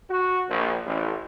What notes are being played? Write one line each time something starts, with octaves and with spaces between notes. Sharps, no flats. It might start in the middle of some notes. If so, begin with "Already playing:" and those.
F#4
A#1
A1